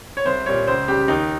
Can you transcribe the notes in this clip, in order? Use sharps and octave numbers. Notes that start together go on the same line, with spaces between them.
C#5
C2 C5
A#2 G3 C#5
C#2 C5
C#3 G3 G4
D#2 D#4